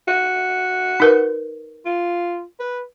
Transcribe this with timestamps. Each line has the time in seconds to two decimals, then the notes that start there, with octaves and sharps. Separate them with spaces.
0.08 F#4
1.00 D#4 A#4 B4
1.85 F4
2.59 B4